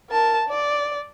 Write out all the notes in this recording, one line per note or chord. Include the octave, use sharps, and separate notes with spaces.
A#4 A5
D5